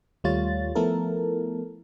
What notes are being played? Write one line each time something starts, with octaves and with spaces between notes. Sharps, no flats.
D#2 G3 A3 F4 C#5 A6
F3 A3 B3 E4 A4 A#4